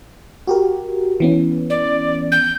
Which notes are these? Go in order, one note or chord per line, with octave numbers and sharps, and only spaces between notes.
F#4 G4 A#4
E3 B3 C#4
D5
G6